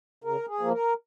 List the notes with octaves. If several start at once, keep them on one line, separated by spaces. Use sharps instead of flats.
C#3 A#4
G#4
F3 A#3
A#4